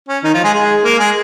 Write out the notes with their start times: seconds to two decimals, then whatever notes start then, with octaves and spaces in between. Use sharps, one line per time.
0.09 C#4
0.24 D#3 D#4
0.34 F3 F4
0.43 G#3 G#4
0.54 G#3 G#4
0.84 A#3 A#4
0.99 G#3 G#4